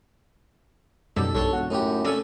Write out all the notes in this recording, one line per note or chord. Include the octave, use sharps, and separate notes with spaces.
F#2 B2 D#3 G3 A4
B1 G2 A4 C#5 C6 C#6
E1 F#4
F#2 A2 D#4 G4
F1 A3 C#4 A4 D5 G#5